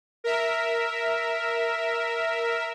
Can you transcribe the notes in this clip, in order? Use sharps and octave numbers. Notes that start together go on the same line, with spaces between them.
A#4 E5